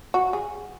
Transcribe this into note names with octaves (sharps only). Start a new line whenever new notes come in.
F#4
G#4